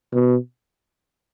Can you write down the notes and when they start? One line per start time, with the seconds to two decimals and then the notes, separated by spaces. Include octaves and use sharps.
0.13 B2